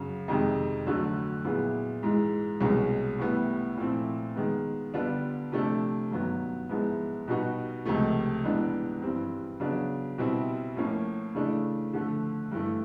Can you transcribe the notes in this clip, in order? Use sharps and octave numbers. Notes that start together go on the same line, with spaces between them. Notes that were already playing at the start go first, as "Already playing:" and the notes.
Already playing: F#2 C#3 F#3
F2 C3 D#3 G#3
D2 D3 F#3 A3
A#2 F#3 B3 E4 G#4
G#2 E3 G#3
C2 B2 G#3 C#4
A2 E3 G3 B3 E4
A#2 F3 A3 C4 E4
D#3 G#3 B3
D3 G3 B3 D4 F4
C3 F3 A3 D4
G2 D#3 F#3 B3
G#2 F3 G#3 B3 E4
B2 G3 B3 D#4 F#4
C#2 C3 F3 A3
G#2 E3 G3 B3 D4
G2 E3 G3 C4
C#3 F#3 B3 D4
B2 G3 C4 E4
A2 F3 A#3 C#4
C#3 E3 A3 D4
D3 F3 A3
G2 E3 A3